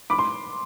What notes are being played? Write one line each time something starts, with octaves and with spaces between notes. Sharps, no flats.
B5 D6
C6